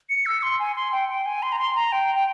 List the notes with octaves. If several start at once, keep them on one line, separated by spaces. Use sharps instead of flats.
C#7
E6
C6
G#5
C6
G5
G5
G#5
C6
A#5
C6
A#5
G5
G5